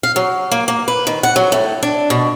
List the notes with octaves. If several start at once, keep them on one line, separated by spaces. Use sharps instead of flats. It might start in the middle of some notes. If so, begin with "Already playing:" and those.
F5
F#3
A#3
A#3
B4
D#3
F#5
F#3
A2
D4
B2